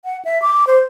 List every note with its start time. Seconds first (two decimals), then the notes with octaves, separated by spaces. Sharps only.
0.05 F#5
0.25 E5
0.42 D6
0.67 C5